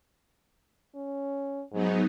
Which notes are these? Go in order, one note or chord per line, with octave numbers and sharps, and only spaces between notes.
C#4
G#2 F#3 B3 D#4